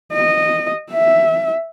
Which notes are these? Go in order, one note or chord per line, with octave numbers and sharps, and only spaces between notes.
D#5
E5